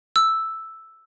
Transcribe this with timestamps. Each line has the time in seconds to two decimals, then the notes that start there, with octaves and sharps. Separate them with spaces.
0.16 E6